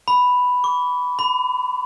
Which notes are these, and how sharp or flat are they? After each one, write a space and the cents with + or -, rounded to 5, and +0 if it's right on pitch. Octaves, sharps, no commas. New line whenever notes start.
B5 +5
D6 -40
B5 +40